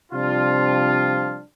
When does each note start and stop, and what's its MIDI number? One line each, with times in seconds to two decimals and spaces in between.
0.12 1.40 48
0.12 1.40 53
0.12 1.40 55
0.12 1.40 62
0.12 1.40 65